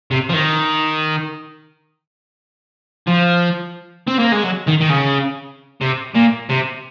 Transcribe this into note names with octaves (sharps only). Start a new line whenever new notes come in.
C3
F3
D#3
F3
C4
A#3
G#3
F#3
D#3
D#3
C#3
C3
A#2
C3